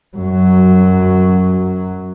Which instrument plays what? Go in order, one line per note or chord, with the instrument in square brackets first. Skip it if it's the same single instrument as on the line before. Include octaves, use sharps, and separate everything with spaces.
[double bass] F#2 F#3